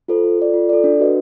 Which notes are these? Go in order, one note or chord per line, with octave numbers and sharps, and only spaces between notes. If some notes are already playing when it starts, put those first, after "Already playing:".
F4 A4 C5
F4
A4 D5
F4
A4 D5
D4
F#4 B4 D#5